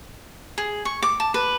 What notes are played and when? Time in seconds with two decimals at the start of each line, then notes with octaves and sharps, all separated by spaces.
0.58 G#4
0.85 C#6
1.02 D6
1.20 A5
1.34 B4